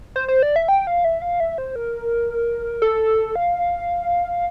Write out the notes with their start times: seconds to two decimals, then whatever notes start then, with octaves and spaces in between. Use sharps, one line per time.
0.16 C5
0.28 C5
0.43 D5
0.56 E5
0.68 G5
0.87 F5
1.04 E5
1.22 F5
1.40 E5
1.58 C5
1.76 A#4
2.82 A4
3.36 F5